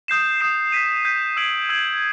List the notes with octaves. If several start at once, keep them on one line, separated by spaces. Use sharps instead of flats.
D#6 G6 C7 E7
D#6 G6 C7 E7
G6 B6 D#7
G6 B6 D#7
E6 G#6 B6 D7 F#7
E6 G#6 B6 D7 F#7